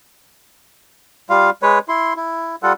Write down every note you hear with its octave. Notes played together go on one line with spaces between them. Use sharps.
G3 F4 F5
G#3 B4 C#5
E4 C6
E4
G3 F4 A4 F#5